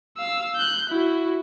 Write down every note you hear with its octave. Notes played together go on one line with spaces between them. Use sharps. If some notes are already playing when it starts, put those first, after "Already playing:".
F5 E6
F#6 G6
E4 F#4